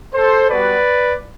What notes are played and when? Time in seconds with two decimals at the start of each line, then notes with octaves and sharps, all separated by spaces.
0.14 A4 C5
0.50 G3 B3 F#4 B4 D5